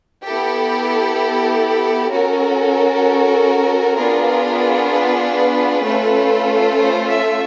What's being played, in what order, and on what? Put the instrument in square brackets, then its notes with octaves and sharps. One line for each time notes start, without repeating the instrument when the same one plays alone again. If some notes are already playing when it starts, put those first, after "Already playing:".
[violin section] B3 E4 G4 A4
C#4 F#4 A4 A#4
B3 D4 F4 G#4
B4
A3 C#4 F4 A4
C5
E5